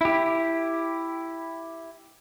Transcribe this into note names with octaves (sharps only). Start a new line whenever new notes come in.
E4 G4